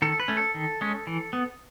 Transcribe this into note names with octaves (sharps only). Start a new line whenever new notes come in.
D#3 A4
B4
A3 C#4
A4
D#3
G#3 C#4
E3
B3